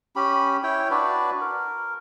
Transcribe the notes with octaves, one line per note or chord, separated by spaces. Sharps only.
C#4 G4 B5
E4 C#5 G5
D4 F#4 B4 D5
A#4